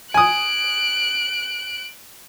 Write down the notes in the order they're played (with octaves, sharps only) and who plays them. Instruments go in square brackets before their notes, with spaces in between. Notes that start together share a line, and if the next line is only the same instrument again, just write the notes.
[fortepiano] G#5 D#6 [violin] F#6 D7